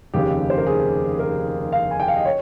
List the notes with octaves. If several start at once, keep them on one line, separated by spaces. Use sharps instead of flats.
F1 D#2 C#3 G4
C5
A#4
G#4
A#4
F5
G#5
G5
F5
D#5
C#5